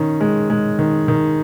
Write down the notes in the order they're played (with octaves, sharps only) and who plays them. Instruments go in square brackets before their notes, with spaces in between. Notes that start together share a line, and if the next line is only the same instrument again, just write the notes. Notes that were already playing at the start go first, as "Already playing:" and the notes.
Already playing: [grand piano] D#3 C#4
G#3
G#3
D#3
D#3